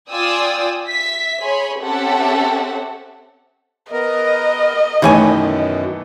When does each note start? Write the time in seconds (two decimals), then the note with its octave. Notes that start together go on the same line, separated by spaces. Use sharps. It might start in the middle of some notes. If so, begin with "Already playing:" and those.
0.11 F4 D5 G5 G#5 D#6 E6
0.89 E5 B6
1.41 G#4 C#5 B5 C6
1.79 C4 C#4 G4 A4 E5 F#5
3.92 B3 A#4 D#5
5.02 F#2 B2 D#3 E3 A3 E4 C#5 G#5